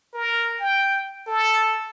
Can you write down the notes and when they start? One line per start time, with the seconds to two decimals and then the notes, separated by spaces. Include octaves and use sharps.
0.14 A#4
0.59 G5
1.27 A4